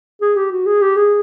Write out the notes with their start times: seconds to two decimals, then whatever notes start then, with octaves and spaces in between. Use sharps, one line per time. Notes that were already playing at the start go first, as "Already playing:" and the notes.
0.21 G#4
0.36 G4
0.52 F#4
0.66 G#4
0.82 G4
0.96 G#4